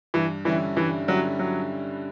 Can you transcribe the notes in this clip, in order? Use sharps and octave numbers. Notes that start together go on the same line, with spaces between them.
G2 E3
D3 E3 G3 C#4 E4
G2 E3
D3 F#3 G3 C#4 E4
F#3